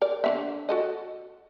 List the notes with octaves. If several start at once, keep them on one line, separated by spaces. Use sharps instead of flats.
A#4 D5
D3 C#4 E5
F#4 A4 D#5